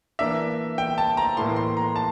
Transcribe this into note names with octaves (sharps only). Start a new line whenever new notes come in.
E3 A#3 D4 E5
G5
A5
A#5
A2 E3 A#3 E4 C6
C6
A#5
A5